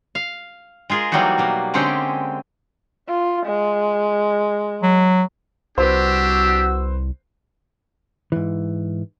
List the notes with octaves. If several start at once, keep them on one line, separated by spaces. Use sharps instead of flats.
F5
G#3 F4 G#4 A#4
E3 F#3 G3 A#3 D#4 F#4
B2 A#3
D3 G#3 C4 C#4 G4
F4
G#3
F#3
C2 D4 F#4 G4 B4 C5 E6
G#2 E3